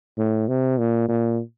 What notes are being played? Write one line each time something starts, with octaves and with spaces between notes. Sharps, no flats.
A2
C3
A#2
A#2